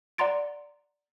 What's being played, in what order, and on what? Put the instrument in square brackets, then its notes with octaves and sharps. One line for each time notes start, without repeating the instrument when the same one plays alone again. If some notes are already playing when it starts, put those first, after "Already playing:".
[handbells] D5 F#5 A#5 C6 A6 D7